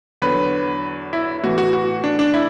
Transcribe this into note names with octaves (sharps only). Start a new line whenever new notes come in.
E2 D3 F#3 B4
E4
A2 E3 F#4
F#4
F#4
D4
D4
E4